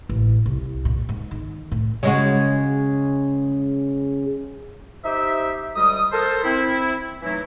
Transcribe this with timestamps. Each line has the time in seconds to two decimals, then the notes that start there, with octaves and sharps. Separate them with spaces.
0.09 A1
0.46 C2
0.85 A#2
1.09 G#2
1.31 D#3
1.72 A2
2.03 C#3 G#3 F#4
5.05 D#4 G4 C5 E5
5.75 D2 G3 G#3 D#6
6.12 A4 A#4 C5
6.44 C4 E4
7.23 E3 F#3 A3 D#4 E4